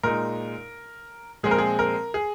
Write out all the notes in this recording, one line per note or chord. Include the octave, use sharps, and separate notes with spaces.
A#2 G#3 D#4 A#4
A#2 F3 G#3 C4 G#4
A#4
G#4
A#4
G#4